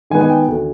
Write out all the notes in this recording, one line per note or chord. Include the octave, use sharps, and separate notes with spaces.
D#3 G#3 B3 G#5
G#5
G5
D2